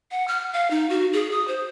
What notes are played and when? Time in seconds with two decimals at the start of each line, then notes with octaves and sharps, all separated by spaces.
0.11 F#5
0.28 F6
0.53 F5
0.70 D#4
0.90 F#4
1.13 G#4
1.31 D#6
1.48 C5